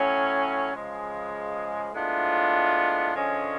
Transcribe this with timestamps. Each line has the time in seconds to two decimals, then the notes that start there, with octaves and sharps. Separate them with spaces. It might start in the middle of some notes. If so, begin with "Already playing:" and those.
Already playing: A2 F#3 C#4
0.73 C#3 F3 G#3
1.93 A2 G#3 B3 D4 F4
3.14 D3 F3 G#3 C#4